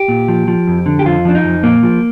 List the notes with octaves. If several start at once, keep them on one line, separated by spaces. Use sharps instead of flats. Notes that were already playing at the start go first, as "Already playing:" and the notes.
Already playing: G4
A#2
F3
F3
F2
D3
G4
F2 F4
F3 D4
D#4
F2
A#2 A#3
F3